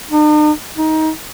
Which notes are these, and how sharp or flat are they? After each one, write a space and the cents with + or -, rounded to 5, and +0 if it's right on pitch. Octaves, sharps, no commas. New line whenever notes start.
D#4 -45
D#4 +20